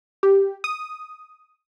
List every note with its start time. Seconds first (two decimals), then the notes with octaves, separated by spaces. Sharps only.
0.23 G4
0.64 D#6